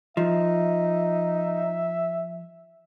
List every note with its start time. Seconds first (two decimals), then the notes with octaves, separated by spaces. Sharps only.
0.17 F3 D#4 E5